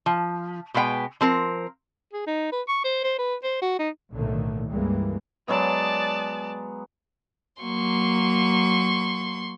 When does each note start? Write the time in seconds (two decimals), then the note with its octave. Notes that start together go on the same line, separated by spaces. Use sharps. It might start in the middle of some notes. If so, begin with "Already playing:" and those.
0.06 F3
0.74 B2 G#3 B3 F5 G5
1.21 F3 C4 A#4
2.13 G#4
2.27 D#4
2.52 B4
2.68 C#6
2.84 C5
3.04 C5
3.19 B4
3.44 C5
3.62 F#4
3.79 D#4
4.13 B1 A2 D3 D#3 A3 A#3
4.70 C#2 G2 E3 G3 G#3 A#3
5.48 F#3 G#3 B3 D5 A5
7.63 F#3 A#3 C6 C#6